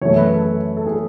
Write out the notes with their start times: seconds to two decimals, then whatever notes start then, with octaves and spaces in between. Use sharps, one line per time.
0.01 F#2 E3 A3 C#5
0.18 B4
0.34 A4
0.77 A4
0.87 G#4